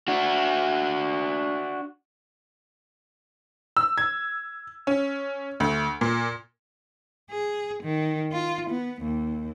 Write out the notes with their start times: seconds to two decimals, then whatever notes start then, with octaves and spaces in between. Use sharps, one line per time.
0.08 D4 F#4
3.77 E6
3.98 G#6
4.87 C#4
5.60 D2
6.01 A#2
7.31 G#4
7.83 D#3
8.32 F4
8.70 B3
9.02 D#2